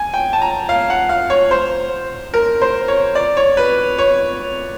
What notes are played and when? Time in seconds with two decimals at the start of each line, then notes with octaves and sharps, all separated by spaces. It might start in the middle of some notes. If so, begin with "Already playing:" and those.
Already playing: G#5
0.14 G5
0.33 A5
0.42 A#5
0.69 F5
0.90 F#5
1.09 F5
1.30 C#5
1.51 C5
2.34 A#4
2.62 C5
2.88 C#5
3.15 D5
3.37 C#5
3.57 B4
3.98 C#5